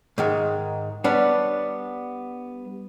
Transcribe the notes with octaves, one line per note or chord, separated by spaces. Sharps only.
G#2 D#3 G#3
G3 B3 D4 C#5